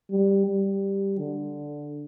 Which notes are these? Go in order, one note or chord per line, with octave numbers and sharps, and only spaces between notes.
G3
G3
D3